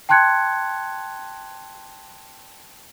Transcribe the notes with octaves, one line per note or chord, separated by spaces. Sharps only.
G5 A5 C6 F#6 G#6 C#7